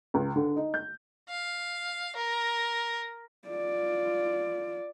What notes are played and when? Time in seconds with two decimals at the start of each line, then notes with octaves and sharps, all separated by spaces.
0.14 C#2
0.36 D3
0.56 D#4
0.74 G6
1.29 F5
2.16 A#4
3.48 F4 D5